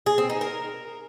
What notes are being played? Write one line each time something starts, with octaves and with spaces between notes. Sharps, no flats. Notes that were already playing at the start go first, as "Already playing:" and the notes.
G#4
C4
D#4
A#4